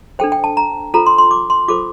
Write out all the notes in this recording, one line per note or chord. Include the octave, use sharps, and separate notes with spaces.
D4 A4 C5 G5
G5
A5
A#5
F4 A4 C5 A#5
C6
C6
D6
C6
F4 A4 C5 D6